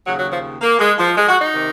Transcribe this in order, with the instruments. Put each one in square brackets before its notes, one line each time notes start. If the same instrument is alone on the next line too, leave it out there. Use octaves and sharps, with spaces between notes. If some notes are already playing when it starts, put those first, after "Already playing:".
[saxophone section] D#2 C#3 F#3
F#3
F3
A#3
G#3
F3
G#3
F#4
D#4
C3 D#3